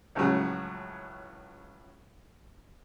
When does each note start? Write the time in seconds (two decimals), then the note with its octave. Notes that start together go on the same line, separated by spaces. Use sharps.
0.15 C#2 A2 C#3 F3 F#3